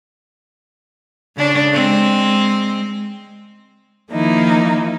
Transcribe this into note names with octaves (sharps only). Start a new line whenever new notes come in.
C#3 D4
G#3 C4
D#3 F3 A#3 D#4 E4